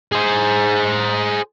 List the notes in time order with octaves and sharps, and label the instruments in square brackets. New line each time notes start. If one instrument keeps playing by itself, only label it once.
[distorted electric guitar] G#4 C5